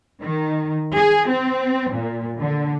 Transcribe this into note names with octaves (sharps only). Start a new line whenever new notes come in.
D#3
G#4
C4
A#2
D3